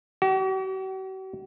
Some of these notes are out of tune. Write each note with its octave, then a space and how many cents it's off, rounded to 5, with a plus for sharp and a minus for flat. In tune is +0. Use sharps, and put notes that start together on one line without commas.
F#4 +45